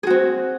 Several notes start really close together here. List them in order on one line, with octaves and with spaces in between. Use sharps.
G#4 F#4 C4